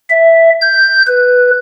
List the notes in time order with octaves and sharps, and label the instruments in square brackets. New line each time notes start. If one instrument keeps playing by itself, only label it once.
[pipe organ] E5
G6
B4